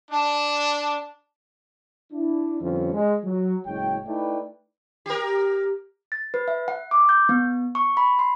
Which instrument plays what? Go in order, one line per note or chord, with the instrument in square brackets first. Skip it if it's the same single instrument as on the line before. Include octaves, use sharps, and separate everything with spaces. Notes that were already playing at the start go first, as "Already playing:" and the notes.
[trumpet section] D4 [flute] A5
[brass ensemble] D4 E4
F2 D3 G3 B3 C#4
G#3
F#3
F#1 A2 G#3 C#5 G5
A3 D#4 E4 B4 D5 G5
[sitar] G4 A#4
[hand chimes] A6
B4
E5
F#5
D6
G6
B3
C#6
B5
C6